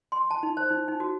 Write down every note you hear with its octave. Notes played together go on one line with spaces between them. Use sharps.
C6
A5
D#4
C5
D#4
D#4
F#4